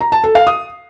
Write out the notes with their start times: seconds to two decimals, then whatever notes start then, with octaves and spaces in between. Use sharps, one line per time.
0.01 A#5
0.12 A5
0.24 A4
0.35 F5
0.47 D#6